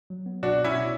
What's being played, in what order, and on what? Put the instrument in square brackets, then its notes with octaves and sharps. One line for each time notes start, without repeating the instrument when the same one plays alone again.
[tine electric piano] F#3
B3
[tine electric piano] B2 [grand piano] D4 F#4
[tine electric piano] B2
[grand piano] C#4 E4
[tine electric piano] B2